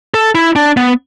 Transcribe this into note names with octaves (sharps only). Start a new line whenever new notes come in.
A4
E4
D4
B3